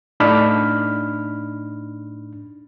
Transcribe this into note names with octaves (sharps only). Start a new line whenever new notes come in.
A2 D4 D#4 B5 F6